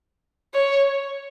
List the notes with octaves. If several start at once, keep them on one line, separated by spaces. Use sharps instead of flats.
C#5